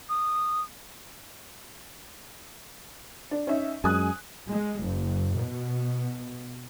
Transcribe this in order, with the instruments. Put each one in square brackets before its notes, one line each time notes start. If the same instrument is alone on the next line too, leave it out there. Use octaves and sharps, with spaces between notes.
[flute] D#6
[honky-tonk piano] D4
C#4 D#4 E5
[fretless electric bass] F#2 G#3 [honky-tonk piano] G#5 D#6 F#6
[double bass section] G#3
F#1
B2